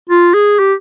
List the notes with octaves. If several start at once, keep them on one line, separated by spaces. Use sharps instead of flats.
F4
G#4
G4